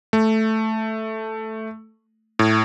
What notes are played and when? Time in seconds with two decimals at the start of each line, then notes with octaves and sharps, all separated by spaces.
0.13 A3
2.39 A2